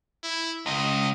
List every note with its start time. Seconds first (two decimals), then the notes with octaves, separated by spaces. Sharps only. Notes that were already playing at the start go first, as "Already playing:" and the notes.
0.23 E4
0.66 C#2 D#5